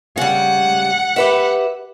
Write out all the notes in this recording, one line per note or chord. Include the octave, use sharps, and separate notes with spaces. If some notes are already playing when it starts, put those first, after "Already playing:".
C#3 G3 F#5
G4 B4 E5